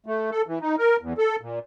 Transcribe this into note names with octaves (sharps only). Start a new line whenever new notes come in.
A3
A4
E3
D#4
A#4
E2
A4
A#2